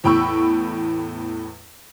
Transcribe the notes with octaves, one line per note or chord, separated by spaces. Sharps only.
E2 A2 G5 B5 C#6 E6